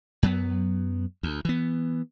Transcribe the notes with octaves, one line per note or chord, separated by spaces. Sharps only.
F#2 F#3 B3
D2
E3 B3